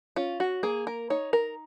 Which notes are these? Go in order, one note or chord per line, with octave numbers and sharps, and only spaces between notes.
C#4 F4
F#4
A#3 G#4
A#4
D#4 C#5
A#4